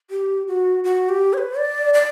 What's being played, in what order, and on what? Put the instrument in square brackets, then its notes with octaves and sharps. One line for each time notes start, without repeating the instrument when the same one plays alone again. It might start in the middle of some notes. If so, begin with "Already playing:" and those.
[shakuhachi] G4
F#4
F#4
G4
C#5
B4
D5
D5